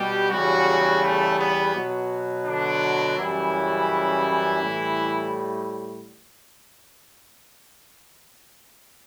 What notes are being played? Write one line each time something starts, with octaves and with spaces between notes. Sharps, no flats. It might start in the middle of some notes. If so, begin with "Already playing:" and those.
Already playing: B2 G3 G4
E2 C#3 F#3 G3 F#4
A3
B3
B2 F#3
D3 D4
F#2 C#3 E3 G3 E4
A2 G3